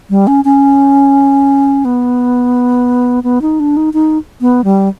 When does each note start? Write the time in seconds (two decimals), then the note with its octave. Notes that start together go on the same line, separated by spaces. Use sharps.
0.10 G3
0.27 C#4
0.45 C#4
1.85 B3
3.24 B3
3.42 D#4
3.60 D4
3.77 D#4
3.94 D#4
4.41 B3
4.64 G3